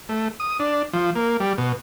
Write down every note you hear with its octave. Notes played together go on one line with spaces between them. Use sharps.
A3
D#6
D4
F3
A#3
G3
B2